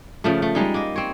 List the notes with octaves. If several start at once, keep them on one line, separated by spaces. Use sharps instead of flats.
C#3 F3 A3
A3
G3 G#3 D#4
A#3 D#5
C4 C#5